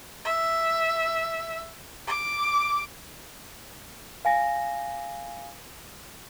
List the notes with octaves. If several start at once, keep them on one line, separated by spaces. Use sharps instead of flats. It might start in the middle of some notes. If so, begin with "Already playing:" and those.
E5
D6
F5 G#5 A#6